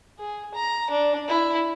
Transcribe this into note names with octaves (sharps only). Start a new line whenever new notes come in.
G#4
A#5
D4
E4